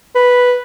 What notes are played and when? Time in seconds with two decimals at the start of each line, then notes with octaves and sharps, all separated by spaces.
0.15 B4